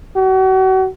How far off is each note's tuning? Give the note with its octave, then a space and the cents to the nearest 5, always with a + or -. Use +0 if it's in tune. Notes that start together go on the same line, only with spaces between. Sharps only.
F#4 +35